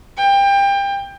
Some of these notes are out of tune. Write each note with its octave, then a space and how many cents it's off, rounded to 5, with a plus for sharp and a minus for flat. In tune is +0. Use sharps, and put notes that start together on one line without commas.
G5 +25